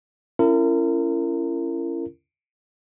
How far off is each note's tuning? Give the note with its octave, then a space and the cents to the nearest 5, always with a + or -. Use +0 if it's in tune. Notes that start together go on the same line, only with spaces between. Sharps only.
C#4 +0 E4 +35 A#4 -30